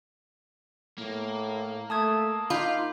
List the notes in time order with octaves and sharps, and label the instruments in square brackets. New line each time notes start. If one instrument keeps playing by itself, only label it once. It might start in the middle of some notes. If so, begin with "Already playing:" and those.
[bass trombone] A2 [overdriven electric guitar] A#3
[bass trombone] A3 [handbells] A5 D#6 G#6
[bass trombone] D#4 [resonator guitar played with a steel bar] F4 [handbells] B5 D6 G6